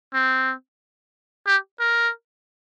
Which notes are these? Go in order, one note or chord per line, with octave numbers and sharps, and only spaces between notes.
C4
G4
A#4